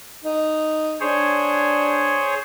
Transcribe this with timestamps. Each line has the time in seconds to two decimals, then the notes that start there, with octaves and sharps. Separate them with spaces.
0.24 D#4
1.00 D4 G#4 C5 C#5